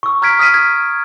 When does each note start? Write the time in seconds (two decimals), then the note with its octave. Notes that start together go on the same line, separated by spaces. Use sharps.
0.03 C#6 E6
0.22 A#5 E6 F6 G#6 B6 D7
0.39 D#6 F6 B6 D#7
0.54 G#6